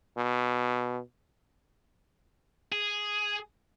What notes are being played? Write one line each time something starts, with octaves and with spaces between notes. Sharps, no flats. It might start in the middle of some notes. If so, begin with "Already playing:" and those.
B2
G#4